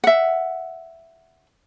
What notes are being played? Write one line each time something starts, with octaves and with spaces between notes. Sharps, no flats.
E5 F#5